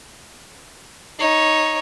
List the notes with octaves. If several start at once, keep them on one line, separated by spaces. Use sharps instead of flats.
D#4 C#5